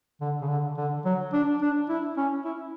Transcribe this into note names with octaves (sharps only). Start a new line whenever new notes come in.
D3
C#3
D3
D3
F#3
D4
D4
E4
C#4
E4